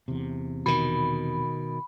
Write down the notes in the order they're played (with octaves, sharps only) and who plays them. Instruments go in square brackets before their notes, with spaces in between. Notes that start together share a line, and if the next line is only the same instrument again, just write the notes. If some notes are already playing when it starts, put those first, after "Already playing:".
[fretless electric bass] E2 C3
[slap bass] B2 D#3 [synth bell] B5